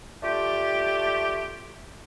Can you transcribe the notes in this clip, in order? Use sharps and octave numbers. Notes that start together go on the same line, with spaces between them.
A3 D4 F4 G4